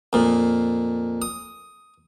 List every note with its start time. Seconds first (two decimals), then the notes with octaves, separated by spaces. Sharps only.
0.13 F2 A#2
1.22 D#6